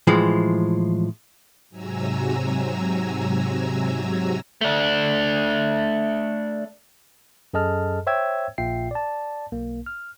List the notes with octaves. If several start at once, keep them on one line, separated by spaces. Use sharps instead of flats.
A2 E3 F3 G#3
G#2 C3 F#3 G#5 A#5 E6
A3 D4
F#2 G#4 A4 D#5 A5 F6
C5 C#5 E5 G5 E6 G#6
A#1 A#2 F4 E5 G5 C7
D5 A5
B1 A#3
F6